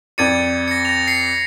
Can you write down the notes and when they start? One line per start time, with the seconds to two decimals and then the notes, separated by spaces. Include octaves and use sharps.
0.18 F2 D5 G#6 A6 C#7 D#7
0.68 A#6 C#7
0.85 A#6 F7
1.07 C7 C#7